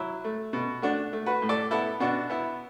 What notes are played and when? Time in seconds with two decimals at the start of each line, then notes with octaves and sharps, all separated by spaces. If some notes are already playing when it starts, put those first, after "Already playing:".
Already playing: F#3 E4
0.24 A3
0.53 B2
0.82 A3 D4 F#4
1.13 A3
1.26 F#4 B4
1.42 A2
1.49 A4 D5
1.71 B3 E4 A4
2.00 B2 D4 F#4
2.30 B3 E4